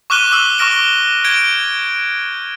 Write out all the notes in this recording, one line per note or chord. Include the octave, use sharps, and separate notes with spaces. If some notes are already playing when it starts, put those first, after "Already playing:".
C#6 D6 F6 F#6 D#7 G7
D6 E6 F#7
C#6 D6 F6 A#6 D7 G7
G6 G#6 D7 G7